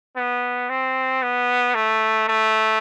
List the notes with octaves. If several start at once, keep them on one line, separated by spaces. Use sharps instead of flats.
B3
C4
B3
A3
A3